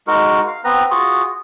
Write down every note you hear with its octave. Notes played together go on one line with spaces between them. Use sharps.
G#3 D#4 F#4 A#4
F5
B3 C4 B4 A#5
F4 F#4 G#4